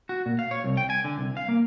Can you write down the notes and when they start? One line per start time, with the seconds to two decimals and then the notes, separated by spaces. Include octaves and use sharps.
0.09 F#4
0.26 A#2
0.39 F5
0.51 C#5
0.64 C2
0.77 G5
0.90 G#5
1.04 D3
1.18 C2
1.37 F5
1.49 A#3